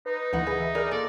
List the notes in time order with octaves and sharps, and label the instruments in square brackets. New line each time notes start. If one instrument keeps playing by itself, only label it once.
[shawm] D#4 [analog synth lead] B4
[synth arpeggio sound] D2 E3 [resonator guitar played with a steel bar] A#2 D#5 F#5 [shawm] D#4
[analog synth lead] E3 [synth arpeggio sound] G#4 [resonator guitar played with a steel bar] B4
[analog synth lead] E5
[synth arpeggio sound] G#4 F6 [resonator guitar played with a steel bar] A#4 [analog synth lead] D5
[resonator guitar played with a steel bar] A#2 [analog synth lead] A4 [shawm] D5